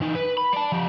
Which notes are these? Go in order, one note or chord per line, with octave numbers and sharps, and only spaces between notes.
E3 D#4
B4
B5
D5 A5
F3 G4